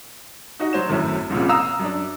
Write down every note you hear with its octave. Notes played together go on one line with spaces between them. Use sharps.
D#4 F#4 D#5
F#3 C5 C#5 E7
G#1 F#2 A2 E4
F1 C2 A#2 C#3
F5 A#5 D#6 E6
F#2 D4